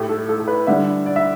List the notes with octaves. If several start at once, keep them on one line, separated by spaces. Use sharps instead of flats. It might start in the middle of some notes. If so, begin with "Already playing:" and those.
Already playing: A2 A3 G4
A4
A4
A4
B4
D3 G3 E5
D5
E5